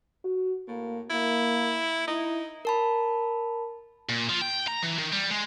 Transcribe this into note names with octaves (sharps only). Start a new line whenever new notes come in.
F#4
A2 A#3
A#3 E4
D#4 E4
A#4 A5 B5
A#2
F3
G5
A#5
E3
D#3
G3
G#3